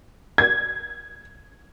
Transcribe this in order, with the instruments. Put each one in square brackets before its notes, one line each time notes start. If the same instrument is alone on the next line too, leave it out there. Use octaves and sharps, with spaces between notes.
[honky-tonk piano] G#6